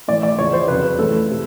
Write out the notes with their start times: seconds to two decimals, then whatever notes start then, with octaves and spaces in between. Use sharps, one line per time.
0.08 A2 E3 D5
0.23 D5
0.38 E2 C#3 F3 C#5
0.53 C5
0.68 F2 C#3 F#3 B4
0.99 A2 E3 A4
1.31 C3